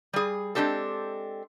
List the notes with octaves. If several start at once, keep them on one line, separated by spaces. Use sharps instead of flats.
G3 G#4
G#3 C4 D4 G4 A4